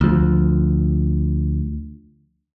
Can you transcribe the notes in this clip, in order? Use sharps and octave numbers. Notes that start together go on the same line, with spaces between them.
D2 F3